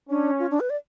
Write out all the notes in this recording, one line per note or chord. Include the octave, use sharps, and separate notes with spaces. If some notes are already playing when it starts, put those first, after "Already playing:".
C#4 D4
F4
D4
B4
D5